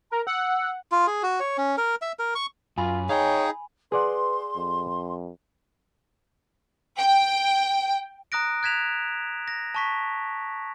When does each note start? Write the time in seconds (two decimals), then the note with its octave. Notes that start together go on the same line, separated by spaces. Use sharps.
0.11 A#4 A#5
0.27 F#5 E6
0.92 F4
1.07 G#4
1.23 F#4
1.40 C#5
1.58 C#4
1.78 A#4
2.02 E5
2.19 A#4
2.35 C#6
2.78 F#2 F4 G#5 B5
3.09 D#4 G#4 C#5 F5 G5
3.92 G#4 B4 D5 F#5 C6
4.56 F2
6.98 G5
8.32 A#5 D#6 F#6 A#6 D7
8.63 F#6 G#6 B6 E7 F7
9.48 A#6
9.75 A5 C#6 B6